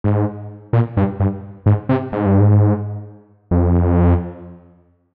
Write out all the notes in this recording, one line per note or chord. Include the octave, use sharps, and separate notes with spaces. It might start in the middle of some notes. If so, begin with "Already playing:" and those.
G#2
A#2
G2
G2
G#2
C3
G#2
G2
G#2
F2